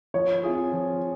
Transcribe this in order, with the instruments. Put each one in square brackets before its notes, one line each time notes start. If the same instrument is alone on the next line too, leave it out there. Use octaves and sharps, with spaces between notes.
[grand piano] F3 [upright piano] C#5
[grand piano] C4 F4 G#4
F3